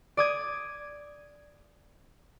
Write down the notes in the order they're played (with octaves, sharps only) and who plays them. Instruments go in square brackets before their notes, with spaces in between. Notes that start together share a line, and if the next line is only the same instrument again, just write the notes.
[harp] D5 D#6 G#6